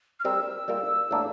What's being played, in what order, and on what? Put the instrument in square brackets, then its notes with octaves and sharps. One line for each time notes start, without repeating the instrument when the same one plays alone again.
[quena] F6
[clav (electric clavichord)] G3 C4 G4 A#4 [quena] E6
[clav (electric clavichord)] G3 A#3 F4 A#4
A2 E3 A#3 D4